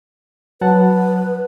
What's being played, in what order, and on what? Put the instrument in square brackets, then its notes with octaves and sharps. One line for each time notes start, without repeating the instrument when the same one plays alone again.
[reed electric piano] F#3 F#5 A5 [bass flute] B4